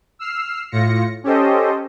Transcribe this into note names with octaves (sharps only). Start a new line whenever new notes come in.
E6 F6 C7
A2 F4 A#6 C#7
C#4 G4 A4 C5 D#5